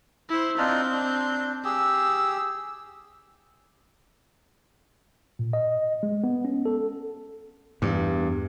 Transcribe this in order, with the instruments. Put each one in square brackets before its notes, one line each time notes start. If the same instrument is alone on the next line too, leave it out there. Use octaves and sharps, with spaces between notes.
[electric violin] E4 C5
[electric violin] C4 G6 [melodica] D4 D#4 F4
[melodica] D4
[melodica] G4 G#4 [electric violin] E6
[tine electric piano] A#2
D#5
G#3
B3
C#4
A4
[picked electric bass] E2 [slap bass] G2